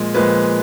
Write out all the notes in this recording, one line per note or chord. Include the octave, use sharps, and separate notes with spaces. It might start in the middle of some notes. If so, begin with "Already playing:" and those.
Already playing: A#2 F3 G#3
A#2 F3 G#3 B4